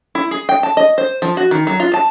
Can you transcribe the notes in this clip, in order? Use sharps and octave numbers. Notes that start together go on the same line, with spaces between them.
E4
G#4
G5
A5
D#5
C5
F3
F#4
D#3
F#3
F4
A5